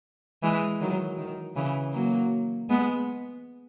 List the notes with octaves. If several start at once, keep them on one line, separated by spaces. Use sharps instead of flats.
E3 G#3
D#3 F#3
D#3
C#3 E3
F#3 A#3
G#3 B3